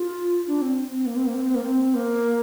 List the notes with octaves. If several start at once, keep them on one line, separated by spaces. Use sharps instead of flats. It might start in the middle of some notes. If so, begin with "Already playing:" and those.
Already playing: F4
D4
C4
C4
A#3
C4
A#3
C4
C4
A#3
C4
A#3